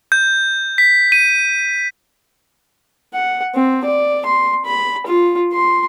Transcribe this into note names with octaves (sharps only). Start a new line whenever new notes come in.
G6
B6
D#7
F#5
C4
D5
C6
B5
F4
C6